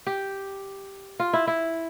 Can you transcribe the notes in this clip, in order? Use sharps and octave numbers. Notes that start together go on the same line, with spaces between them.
G4
F4
E4
E4